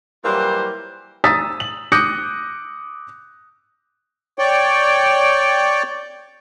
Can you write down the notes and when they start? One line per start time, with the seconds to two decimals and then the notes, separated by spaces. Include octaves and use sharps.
0.25 E3 F#3 G3 A#3 F4 C5
1.24 A#5 D#6 E6 A6 B6
1.60 F#7
1.92 D6 D#6 F#6 G6 A#6 C#7
4.39 C#5 D5 G5